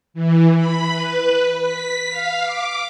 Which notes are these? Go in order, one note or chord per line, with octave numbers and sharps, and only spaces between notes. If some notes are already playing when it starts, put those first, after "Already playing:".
E3
B5
B4
B6
F5
D6